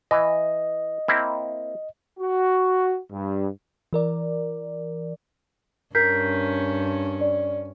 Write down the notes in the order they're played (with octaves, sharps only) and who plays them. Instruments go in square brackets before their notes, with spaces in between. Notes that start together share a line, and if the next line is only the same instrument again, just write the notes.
[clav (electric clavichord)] E3 [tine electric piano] D#5
[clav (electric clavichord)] A#3 C4 E4
[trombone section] F#4
G2
[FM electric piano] E3 A#4 D5
[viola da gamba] G2 C#4 [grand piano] A#4 [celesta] G6 B6 C7
[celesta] D5